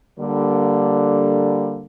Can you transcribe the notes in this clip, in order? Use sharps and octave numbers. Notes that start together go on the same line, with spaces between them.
D3 G3 A#3